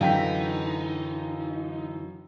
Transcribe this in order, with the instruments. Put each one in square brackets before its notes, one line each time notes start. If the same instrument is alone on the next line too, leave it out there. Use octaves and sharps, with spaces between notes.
[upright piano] F#2 [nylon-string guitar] D3 E3 [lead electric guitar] D#4 [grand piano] F5 G5 B6